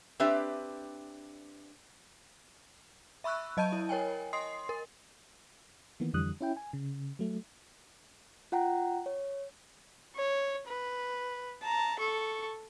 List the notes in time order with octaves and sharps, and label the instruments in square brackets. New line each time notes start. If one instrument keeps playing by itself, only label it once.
[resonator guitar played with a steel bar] C4 D4 G4 B4 E5
[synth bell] E5 B5 C#6 E6 F#6
F#3 D#5 A5 G6 D#7
E4
A#4 C#5 G5 G#5
D#5 C6 D#6 C7
A#4
[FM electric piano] D#3 E3 A#3 B3
F2 D3 E3 G3 D#6 F#6
C#4 E4 G5
G#5
C#3
F#3 A3
[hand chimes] F4 F#5 G5 A#5
C#5
[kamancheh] C#5
B4
A5 A#5
A4 C#6